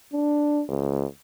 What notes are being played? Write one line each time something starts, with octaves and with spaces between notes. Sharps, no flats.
D4
C#2